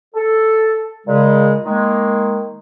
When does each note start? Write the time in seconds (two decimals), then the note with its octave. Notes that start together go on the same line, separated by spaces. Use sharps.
0.15 A4
1.07 A#2 C#3 G#3
1.65 D#3 G#3 A#3